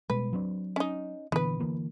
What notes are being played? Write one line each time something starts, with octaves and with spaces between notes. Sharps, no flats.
B2 G3 G#3 B4
F#3 C4 D4
C#4 D#4
A#2 D3 E3 B3 B4
D3 E3 A#3